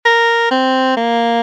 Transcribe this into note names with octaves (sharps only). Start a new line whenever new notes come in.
A#4
C4
A#3